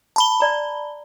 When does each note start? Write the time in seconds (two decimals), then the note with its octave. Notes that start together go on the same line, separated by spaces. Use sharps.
0.16 A5 B5 G7
0.40 D5 A#5